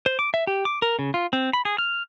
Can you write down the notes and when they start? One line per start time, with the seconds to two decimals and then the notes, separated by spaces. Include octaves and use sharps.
0.06 C5
0.19 D6
0.34 E5
0.47 G4
0.65 D6
0.82 A#4
0.99 C#3
1.14 F4
1.33 C4
1.53 B5
1.65 G#4
1.78 F6